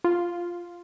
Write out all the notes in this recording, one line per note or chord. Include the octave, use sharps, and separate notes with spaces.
F4